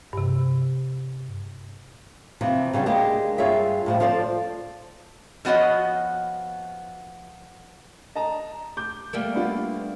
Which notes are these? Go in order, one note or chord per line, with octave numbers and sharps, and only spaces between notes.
G2 C3
C3 E3 F3
C#3 G3 B3 D4
G#3 A#3 D4 G4
G2 F4 G#4 C#5 E5
A2 F3 G3
F3 F4 A4 C5 D5
F3 B3 F#4 C#5 D#5
D#5 A5 A#5
D6 G6
G3 A3 A#3
B3 D4 F4